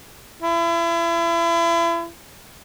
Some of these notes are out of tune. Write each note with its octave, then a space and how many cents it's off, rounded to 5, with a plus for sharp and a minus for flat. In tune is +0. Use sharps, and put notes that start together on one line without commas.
E4 +35